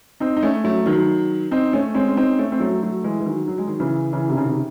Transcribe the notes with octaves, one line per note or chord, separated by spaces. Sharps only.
C4 D#4
D#4
A3 C#4
F#3 A3
D#3 F#3
C4 D#4
A3 C#4
G#3 C4
C#4
C4 D#4
A3 C#4
C4
F#3 A3
F#3 A3
E3 G#3
E3
D#3 F#3
F#3
G#3
D#3 F#3
C#3 E3
C#3 E3
C3 D#3
C#3
C3 D#3